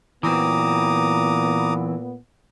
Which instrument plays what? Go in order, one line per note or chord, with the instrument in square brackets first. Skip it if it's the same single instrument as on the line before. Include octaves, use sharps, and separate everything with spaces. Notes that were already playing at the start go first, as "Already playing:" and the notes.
[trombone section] A#2 B3 [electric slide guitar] E3 F#3 C4 [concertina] A#5 D6 D#6